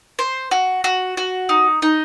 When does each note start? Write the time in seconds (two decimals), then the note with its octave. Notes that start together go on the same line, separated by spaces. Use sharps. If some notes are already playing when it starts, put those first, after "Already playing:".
0.19 C5
0.51 F#4
0.84 F#4
1.17 F#4
1.49 D#4
1.82 D#4